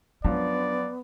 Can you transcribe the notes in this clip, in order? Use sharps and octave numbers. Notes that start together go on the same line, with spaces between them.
F#2 F3 B3 D4 D5